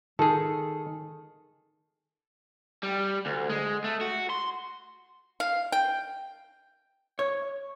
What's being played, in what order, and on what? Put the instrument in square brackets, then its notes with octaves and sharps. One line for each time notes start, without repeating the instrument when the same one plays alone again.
[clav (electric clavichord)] D#3 G#4 [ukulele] A4
[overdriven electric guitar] G3
D2
G#3
A3
F#4
C6
[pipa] F5
G5
[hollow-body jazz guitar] C#5